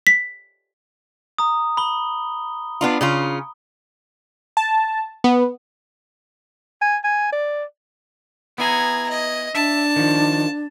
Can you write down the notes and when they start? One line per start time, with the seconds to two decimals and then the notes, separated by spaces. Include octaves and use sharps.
0.07 B6
1.38 A#5 D#6
1.77 B5 G7
2.81 B3 D4 F4
3.01 C#3 C#4 F4
4.57 A5
5.24 B3
6.82 G#5
7.04 G#5
7.32 D5
8.58 B3 E4 G#4 G#5 A#5
9.09 D#5
9.55 D4 E5 A5
9.96 D#3 F3